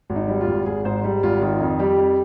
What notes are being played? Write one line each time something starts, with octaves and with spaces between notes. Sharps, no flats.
G#1
D#4
G3
F4
G#1
G#1 G#4
G#2 C5
G3
G#1 F4
D#3 F4
F2
G3 G4
F2